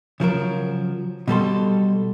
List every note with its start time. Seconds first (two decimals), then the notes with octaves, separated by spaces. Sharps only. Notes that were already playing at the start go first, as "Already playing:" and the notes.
0.20 C#3 F3 F#3 A#4
1.28 B2 G3 A4 C6